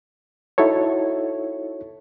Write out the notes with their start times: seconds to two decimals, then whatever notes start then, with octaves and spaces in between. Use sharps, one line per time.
0.58 D#4 E4 F#4 A4 C#5